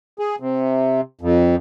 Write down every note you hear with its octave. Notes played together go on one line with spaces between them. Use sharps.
G#4
C3
F2